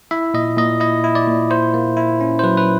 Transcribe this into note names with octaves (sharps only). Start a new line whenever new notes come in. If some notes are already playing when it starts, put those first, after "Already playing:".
E4 E5
A#2 D#5
A#2 D#5
E4 D#5
E4
D5
A#2
E4 C5
A#3
E4
C#4
C5
F#3 B4
B4